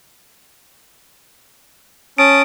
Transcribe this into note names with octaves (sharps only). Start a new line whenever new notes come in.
C#4 A5 D#6 D7